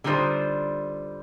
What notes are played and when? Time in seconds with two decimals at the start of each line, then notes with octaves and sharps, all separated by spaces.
0.04 D3 G3 D#4 F4 C5